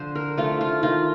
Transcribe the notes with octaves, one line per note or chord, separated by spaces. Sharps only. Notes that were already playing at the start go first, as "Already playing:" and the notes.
Already playing: D3 F3 C5
A#4
F3 A3 F4
F4
D#3 F4